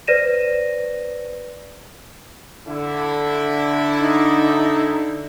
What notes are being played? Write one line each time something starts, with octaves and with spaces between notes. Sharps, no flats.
B4 C5 D5 A#6 D#7 E7
D3 E4
D#4